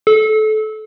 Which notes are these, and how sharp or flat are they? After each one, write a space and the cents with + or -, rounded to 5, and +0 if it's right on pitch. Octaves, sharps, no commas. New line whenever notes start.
A4 -25